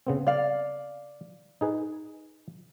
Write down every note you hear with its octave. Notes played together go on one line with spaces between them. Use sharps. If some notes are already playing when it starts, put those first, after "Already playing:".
C#3 B3 C4
D5 F5
D#4 G#4 B4